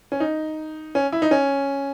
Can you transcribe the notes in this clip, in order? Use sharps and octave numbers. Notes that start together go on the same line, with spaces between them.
C#4
D#4
C#4
E4
D#4
C#4